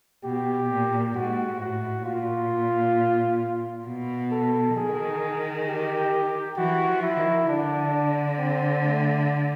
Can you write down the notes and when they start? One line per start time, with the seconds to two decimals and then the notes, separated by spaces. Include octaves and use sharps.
0.24 B2 G4
0.69 A#2
1.15 G#2 F#4
1.60 A2 F#4
2.05 A#2 F4
3.86 B2
4.31 A4
4.76 D#3 G#4
5.67 G4
6.57 E3 F#4
6.87 F3
7.02 E4
7.17 D#3
7.48 D3 D4
8.38 C4
8.83 A3